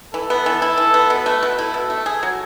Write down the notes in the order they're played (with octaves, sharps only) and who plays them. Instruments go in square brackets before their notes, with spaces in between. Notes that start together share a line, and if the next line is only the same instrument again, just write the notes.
[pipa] E3 [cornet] A4
[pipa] B3
E3
E4
E3
B3
[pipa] B2 [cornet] B4
[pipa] A3
B2
[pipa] E4 [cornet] A4
[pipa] B2
A3
G#4
F#3